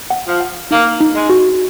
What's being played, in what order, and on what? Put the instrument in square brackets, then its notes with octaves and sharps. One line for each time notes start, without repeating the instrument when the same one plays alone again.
[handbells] F#5
[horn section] F3
[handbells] F#5
[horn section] A#3 [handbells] D#4
[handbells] D#4
[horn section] G#3
[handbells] F#4